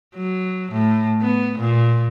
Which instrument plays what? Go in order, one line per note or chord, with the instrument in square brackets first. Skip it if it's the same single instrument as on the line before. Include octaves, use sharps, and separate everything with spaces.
[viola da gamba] F#3
A2
B3
A#2